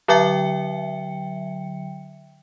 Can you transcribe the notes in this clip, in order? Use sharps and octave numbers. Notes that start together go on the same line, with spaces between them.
D3 F#3 E5 G5 C#7